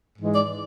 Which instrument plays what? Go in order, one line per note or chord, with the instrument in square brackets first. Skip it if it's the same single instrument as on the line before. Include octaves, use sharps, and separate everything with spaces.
[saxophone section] G#2 E3 G#3
D5